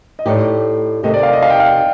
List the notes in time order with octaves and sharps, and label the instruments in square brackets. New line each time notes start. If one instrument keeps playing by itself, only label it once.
[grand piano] D#5
[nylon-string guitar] A2 A3 D#4 G4 [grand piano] D5
[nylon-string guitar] C3 D#3 A3 C4 G4 [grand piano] D#5
[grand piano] D5
F5
D#5
F5
G5
F5